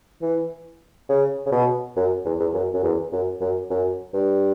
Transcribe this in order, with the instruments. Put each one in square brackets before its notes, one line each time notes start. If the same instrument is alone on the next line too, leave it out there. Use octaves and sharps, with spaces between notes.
[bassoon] E3
C#3
C#3
B2
F#2
E2
E2
F#2
F#2
E2
F#2
F#2
F#2
G2